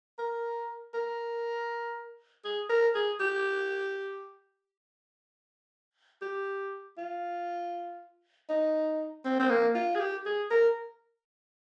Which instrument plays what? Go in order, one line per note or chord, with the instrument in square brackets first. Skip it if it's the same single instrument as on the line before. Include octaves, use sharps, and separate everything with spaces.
[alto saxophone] A#4
A#4
G#4
A#4
G#4
G4
G4
F4
D#4
C4
C4
A#3
F4
G#4
G4
G#4
A#4